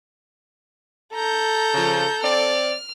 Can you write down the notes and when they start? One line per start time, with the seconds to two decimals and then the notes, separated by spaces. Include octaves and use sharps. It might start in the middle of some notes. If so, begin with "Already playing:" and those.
1.14 A4 A#5 G6
1.74 C#3 F3
2.23 C4 D5 F6